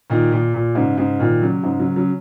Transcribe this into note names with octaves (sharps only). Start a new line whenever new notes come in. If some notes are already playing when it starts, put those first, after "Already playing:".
A#2 D#3
A#2
A#2
G#2 C#3
G#2 C#3
A#2 D#3
C#3 F#3
G#2 C#3
C#3 F#3
C#3 F#3